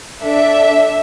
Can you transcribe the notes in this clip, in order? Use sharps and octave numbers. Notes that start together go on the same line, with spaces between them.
D4 A4 E5